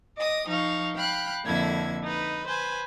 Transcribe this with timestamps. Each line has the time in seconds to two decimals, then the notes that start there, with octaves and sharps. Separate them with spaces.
0.17 D#5 D6 D#6
0.48 F3 D#4 F5 C#6
0.96 F5 G5 B5 F#6
1.45 F2 D3 A#3 E4 G#6
2.04 D#4 B4
2.48 B4 C5 G#5